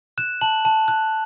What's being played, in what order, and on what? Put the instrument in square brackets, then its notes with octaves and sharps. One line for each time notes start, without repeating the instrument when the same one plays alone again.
[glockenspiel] F#6 E7
A5 F#7
A5
F#6